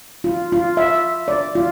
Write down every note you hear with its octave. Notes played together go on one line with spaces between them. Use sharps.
F4
F4
E5
D5
F4